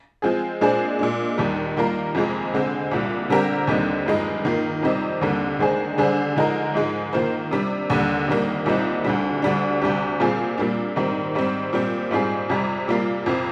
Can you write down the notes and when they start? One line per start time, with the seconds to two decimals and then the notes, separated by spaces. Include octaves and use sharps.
0.22 F3 G#3 C4 F4 G#4
0.61 A#2 G#3 D4 G#4 C5
0.99 A#2 G#3 D4
1.38 D#2 D#3 G3
1.77 D#3 G3 A#3 F4 A#4
2.15 F2 C3 F3 G#3
2.53 D3 G#3 C4
2.91 C2 A#2 G3
3.30 D3 G3 C4 G4 A#4
3.67 D#2 D3 G3 C4 D#4
4.06 G2 F3 G#3 D#4
4.45 D#3 A#3 F4
4.83 F2 C3 G3 C4 D#4
5.21 D#2 D3 G3 A#3
5.59 D#3 G#3 D4 G#4 C5
5.98 D3 G3 D4 G#4 C5
6.36 D3 F3 G#3 D#4 A#4
6.74 G#2 F3 G#3 D#4
7.13 D#3 A#3 F4 C5
7.51 C3 G3 D4
7.90 D#2 D3 G3
8.28 F2 D#3 G3 A#3
8.66 C2 A#2 G3 C4 D#4
9.04 D2 D3 G3
9.42 D2 D3 G3 D4
9.81 D2 C3 G3 D4 G4
10.20 A#2 G3 C4 F4 G#4
10.58 A#2 G3 A#3 D4
10.96 G#2 D#3 G3 C4
11.35 G#2 G3 C4
11.73 A#2 G3 C4
12.11 G#2 G3 C4 F4 G#4
12.50 F2 C3 G3
12.88 A#2 G3 A#3 F4
13.26 F2 C3 F3 C4 F4